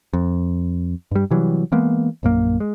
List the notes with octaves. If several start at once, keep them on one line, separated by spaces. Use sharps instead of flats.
F2
G2 G3
C3 E3 F#3 G3
E3 G#3 A#3 B3
A#1 F#2 A#3
G#3